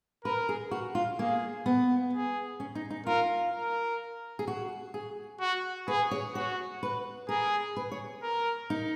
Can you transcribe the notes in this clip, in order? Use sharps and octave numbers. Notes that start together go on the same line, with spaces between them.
A#4 B4
G#4
F#4
F4
A#3 G#4
B3
G#4
C#4
D#4
D#4
F4 A#4
A#4
G#4
F#4
G#4
F#4
G#4 B4
C#5
F#4 C#5
B4
G#4 A#4
B4
C#5
A#4
D#4